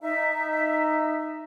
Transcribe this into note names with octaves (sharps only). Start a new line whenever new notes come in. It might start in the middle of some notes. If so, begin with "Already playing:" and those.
D#4 E5